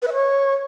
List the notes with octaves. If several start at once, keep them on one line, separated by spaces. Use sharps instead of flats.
B4
E5
C#5